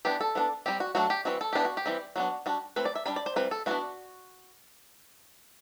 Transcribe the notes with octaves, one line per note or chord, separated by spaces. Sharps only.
E3 B3 D4 G4
A4
E3 B3 D4
G3 C4 G4
F#4
F#3 A3 D4 F#4
G4
E3 G3 C4 F#4
A4
E3 B3 D4 G4
F#4
G4
E3 G3 C4
F#3 B3 D4 F#4
G3 D4 F#4
E3 A3 C4 B4
D5
E5
G3 D4 B5
D5
C5
E3 G3 C4 B4
A4
E3 B3 D4 F#4